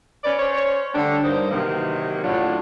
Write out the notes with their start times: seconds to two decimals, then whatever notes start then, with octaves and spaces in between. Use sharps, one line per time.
0.24 C#4 B4 D5
0.39 C#4 C5 C#5
0.95 D3 G3 A3 D4
1.24 G2 A#3 D#4 C5
1.51 C3 D#3 E3 F#3 A#3
2.24 A2 F#3 C#4 D4 F4